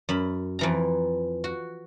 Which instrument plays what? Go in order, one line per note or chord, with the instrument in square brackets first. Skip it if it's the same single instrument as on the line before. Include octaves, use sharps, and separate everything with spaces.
[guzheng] F#2 B5
F2 E3 A#5
F#4